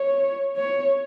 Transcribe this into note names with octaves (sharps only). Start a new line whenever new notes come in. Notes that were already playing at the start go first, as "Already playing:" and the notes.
Already playing: C#5
C#5